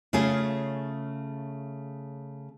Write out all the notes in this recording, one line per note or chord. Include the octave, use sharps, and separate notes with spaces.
C#3 A3 C#4 F4 G#4